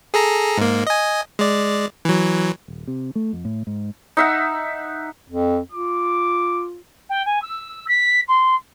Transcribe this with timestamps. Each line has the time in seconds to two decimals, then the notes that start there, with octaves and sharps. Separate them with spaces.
0.14 G#4 A4 A#5
0.58 G#2 A#3
0.87 D#5 G#5
1.39 G#3 D5
2.05 E3 F#3
2.68 D#1
2.87 C3
3.15 A3
3.33 F2
3.45 A2
3.67 G#2
4.17 D#4 E5 F#5
5.30 F2
5.72 F4 D6
7.10 G5
7.26 G#5
7.42 E6
7.88 B6
8.28 C6